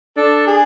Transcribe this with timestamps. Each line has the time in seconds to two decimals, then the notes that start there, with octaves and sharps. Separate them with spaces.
0.17 D4 A4
0.47 G#4